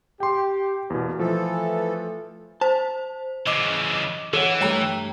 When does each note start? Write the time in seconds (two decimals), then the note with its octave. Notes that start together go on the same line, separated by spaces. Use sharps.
0.20 G4 G5 C6
0.90 E2 B2 A#3
1.19 E3 F3 A3 A4
2.61 C5 A5
3.47 C#3 E3 D#5 D6
4.33 E3 A4 C#5 F#5
4.61 G2 G3 A3 C#5 G5 A#5